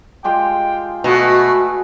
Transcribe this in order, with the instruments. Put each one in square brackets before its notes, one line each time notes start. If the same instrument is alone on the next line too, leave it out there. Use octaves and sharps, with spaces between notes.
[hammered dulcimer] G#3 F4 G4 [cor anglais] G5
[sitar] B2 [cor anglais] A3 [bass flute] F#4 [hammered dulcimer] G#4 B4 F#5